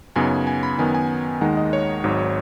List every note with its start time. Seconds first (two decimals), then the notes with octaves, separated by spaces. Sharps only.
0.16 F#2 C#3 B3 D#4 G#5
0.47 G#5
0.63 B5
0.78 F#2 D#3 B3 G#5
0.94 G#5
1.41 D#2 D#3 G#3 D#4 F#5
1.57 D#5
1.73 C#5
2.04 G#1 G#2 F#3